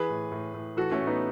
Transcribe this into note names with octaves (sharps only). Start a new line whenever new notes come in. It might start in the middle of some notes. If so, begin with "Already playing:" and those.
Already playing: E3 G#4 B4
A2
A2
A2
E3 F#4 A4
A3 C#4
A2
B3 D#4